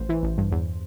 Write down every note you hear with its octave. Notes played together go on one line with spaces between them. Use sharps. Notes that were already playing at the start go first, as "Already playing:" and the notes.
Already playing: A1 C5
E3
A1
G2
E2